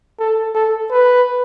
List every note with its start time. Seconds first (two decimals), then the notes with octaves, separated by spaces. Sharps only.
0.19 A4
0.55 A4
0.91 B4